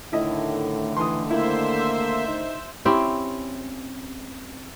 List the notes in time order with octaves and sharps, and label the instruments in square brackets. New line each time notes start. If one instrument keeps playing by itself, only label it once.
[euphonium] A2 [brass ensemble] D3 D#3 A3 [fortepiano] E4 D#5
[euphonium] E3 [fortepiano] C6 D#6
[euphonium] A#3 [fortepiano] E4 [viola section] C5 E5
[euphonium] D#4
[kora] C4 C#4 E4 G4